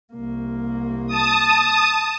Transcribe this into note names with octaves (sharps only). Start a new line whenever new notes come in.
C2 A#3
A5 D#6